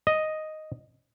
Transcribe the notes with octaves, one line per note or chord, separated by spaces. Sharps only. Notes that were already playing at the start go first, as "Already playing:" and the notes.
D#5